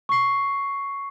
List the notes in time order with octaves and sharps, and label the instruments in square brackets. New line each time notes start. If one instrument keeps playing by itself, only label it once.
[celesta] C#6 C7